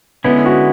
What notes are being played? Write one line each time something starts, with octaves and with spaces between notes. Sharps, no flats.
D3 G#3 B3 C#4 E4
F#4